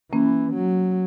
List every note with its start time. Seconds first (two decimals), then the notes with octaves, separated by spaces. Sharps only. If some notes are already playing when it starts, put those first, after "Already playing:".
0.12 E3 A#3 C#4
0.54 F#3